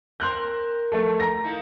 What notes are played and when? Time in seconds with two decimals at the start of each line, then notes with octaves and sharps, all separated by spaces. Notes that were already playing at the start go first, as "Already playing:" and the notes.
0.20 C4 A#4 C6 F#6 G6
0.92 F3 A3 A4
1.20 A#5 A#6
1.44 A#3 D#4 E4